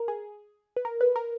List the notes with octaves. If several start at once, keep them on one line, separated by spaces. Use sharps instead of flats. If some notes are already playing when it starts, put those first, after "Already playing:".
Already playing: A#4
G#4
B4
A#4
B4
A#4